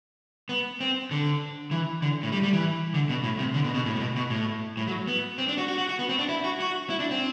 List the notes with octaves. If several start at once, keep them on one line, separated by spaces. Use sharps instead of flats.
B3
C4
D3
E3
D3
A2
G3
G3
E3
D3
B2
A2
C3
D3
B2
B2
A2
A2
B2
B2
A2
A2
F#3
B3
C4
D4
F#4
F#4
F#4
F#4
B3
C4
D4
E4
F#4
F#4
E4
D4
C4